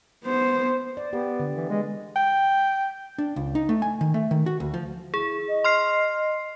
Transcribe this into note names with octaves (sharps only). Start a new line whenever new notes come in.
B3 C5
D5
B3 G4
D3
E3
G#3
G5
D4
C#2
D#4
A3
G#5
D#3
A3
D#3
F#4
D2
F3
E4 G#4
D#5
C6 F6 C7